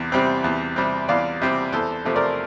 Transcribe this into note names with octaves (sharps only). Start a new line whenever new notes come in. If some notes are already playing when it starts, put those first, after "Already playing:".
Already playing: E2 C3
C3 G3 C4
E2
C3 G3 C4
E2 D5 F5
C3 G3 C4
E2 A4 C5
C3 F3 A3 C4
A#4 D5